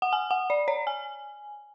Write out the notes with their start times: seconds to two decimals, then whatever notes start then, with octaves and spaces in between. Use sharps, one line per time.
0.02 F#5
0.13 G#5
0.31 F#5
0.50 D5
0.68 C#5
0.87 G#5